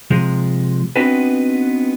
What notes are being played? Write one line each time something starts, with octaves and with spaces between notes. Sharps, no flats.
C3 F3 G#3
B3 C4 D4 D#4 F#4 B4